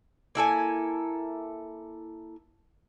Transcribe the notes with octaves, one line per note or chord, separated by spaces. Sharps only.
A#3 E4 A4 G#5